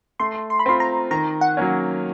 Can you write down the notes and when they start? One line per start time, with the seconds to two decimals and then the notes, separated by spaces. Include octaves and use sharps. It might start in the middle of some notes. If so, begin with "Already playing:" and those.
0.20 A3 C6
0.50 C6
0.59 B5
0.66 C4 F4 C6
0.80 A#5
1.11 D#3 A#5
1.41 F#5
1.57 F#3 A#3 C#4